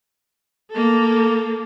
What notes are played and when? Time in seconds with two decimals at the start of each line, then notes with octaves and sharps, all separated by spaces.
0.70 A#3 A4